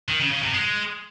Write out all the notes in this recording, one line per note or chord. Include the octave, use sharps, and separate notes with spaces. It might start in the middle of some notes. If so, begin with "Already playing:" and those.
D#3
C#3
C#3
C3
G#3